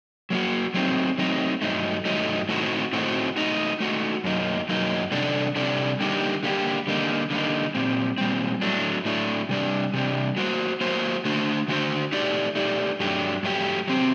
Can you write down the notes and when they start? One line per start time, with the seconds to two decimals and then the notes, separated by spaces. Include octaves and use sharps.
0.30 F#3 A#3 F#4
0.74 F#3 A3 C4 D#4
1.18 F#3 A3 C4 D#4
1.62 G2 F#3 A3 D#4
2.05 G2 F#3 A3 D#4
2.49 A2 A3 C4 D#4 F#4
2.93 A2 A3 C4 D#4 F#4
3.36 A3 D#4 F#4
3.80 A3 D#4 F#4
4.24 F#2 F#3 A#3 D#4
4.69 F#2 F#3 A#3 D#4
5.11 C3 G3 D4 A4 D5
5.56 C3 G3 D4 A4 D5
6.00 D3 G3 A#3 D#4 G4
6.43 D3 G3 A#3 D#4 G4
6.87 D3 G3 A#3 D#4
7.30 D3 G3 A#3 D#4
7.75 A#2 G3 C4
8.18 A#2 G3 C4
8.62 A2 F#3 A3 D4
9.05 A2 F#3 A3 D4
9.49 C3 G3 D4
9.93 C3 G3 D4
10.36 F#3 A#3 F#4 C5
10.81 F#3 A#3 F#4 C5
11.25 D3 A3 D4 F#4 C5
11.68 D3 A3 D4 F#4 C5
12.12 A3 D#4 G4 D5
12.55 A3 D#4 G4 D5
13.00 G2 F#3 A3 D4 G4
13.43 G2 F#3 A3 D4 G4
13.88 F#3 C4 G4